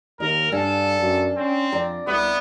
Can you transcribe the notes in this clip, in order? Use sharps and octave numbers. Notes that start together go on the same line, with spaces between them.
D#2 A#4 D#5
G2 D4 A4 F5 G#5
F#2
C4 C#4
F2 D5 A#5
C2 B3 E5 D6